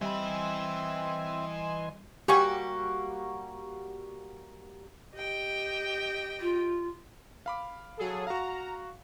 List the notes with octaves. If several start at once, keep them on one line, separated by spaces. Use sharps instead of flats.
E3 G3 C4 D#5 E5 G#5 B5 C6
G3 A#3 F#4 G4 G#5 C#6
G4 D#5 G5
F4
F5 B5 D6
F#3 G#4 A4
F#4 F5 A#5